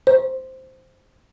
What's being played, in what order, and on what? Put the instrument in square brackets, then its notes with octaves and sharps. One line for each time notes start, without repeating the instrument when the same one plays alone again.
[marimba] C5